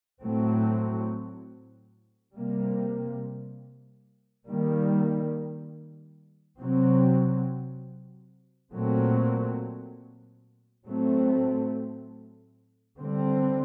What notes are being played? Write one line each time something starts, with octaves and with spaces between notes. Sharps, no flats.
A2 F#3 A3 C4
C3 G3 A#3
D#3 G3 A#3
C3 F#3 C4
A#2 F#3 A3 C4
A2 F#3 A3 C4
D3 G3 C4